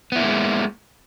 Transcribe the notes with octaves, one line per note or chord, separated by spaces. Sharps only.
G#3 A#3 B3 E4